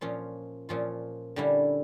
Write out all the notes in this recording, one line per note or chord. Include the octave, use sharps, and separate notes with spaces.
A#2 F3 C#4 F4
A#2 F3 C#4 F4
D3 G3 C#4 E4